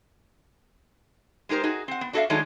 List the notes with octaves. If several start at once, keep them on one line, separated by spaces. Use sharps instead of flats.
G#3 D#4 G4 A#4 C5
D#4 F#4 G#4
C4 F#5
B3
D4 F#4 A4 D5 E5 F5
D#3 F#3 G#3 A3 D4 D#4